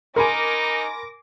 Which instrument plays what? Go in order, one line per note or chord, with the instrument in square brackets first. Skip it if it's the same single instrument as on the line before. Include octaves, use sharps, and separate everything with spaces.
[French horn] D#4 [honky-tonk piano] A#4 [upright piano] G#5 B5 C6 [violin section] D6 A#6